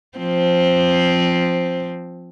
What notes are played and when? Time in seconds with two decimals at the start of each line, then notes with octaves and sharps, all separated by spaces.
0.18 F3 C4